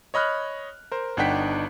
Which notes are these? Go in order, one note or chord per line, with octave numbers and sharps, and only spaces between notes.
C#5 D#5 B5 F6 F#6
A#4 C5
G1 D4 D#4 F#5 G5 B6